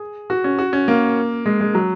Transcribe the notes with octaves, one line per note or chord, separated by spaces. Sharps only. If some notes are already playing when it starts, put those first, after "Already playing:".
Already playing: G#4
F#4
C#4
F#4
C#4
A#3
G#3
G#3
F#3